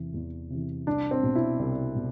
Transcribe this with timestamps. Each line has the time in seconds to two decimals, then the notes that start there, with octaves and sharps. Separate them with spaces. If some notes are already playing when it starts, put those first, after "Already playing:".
Already playing: E2 C3 E3
0.14 E2
0.50 C3 E3
0.87 C2 D4
1.11 C4
1.23 B2
1.35 E4
1.59 C2
1.95 B2